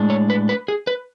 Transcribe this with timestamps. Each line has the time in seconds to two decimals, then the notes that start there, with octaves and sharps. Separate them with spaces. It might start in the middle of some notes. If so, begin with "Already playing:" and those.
Already playing: A2 G#3 D4
0.10 C#5
0.30 B4
0.49 B4
0.68 G#4
0.87 B4